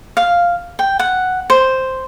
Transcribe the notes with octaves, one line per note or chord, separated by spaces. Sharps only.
F5
G5
F#5
C5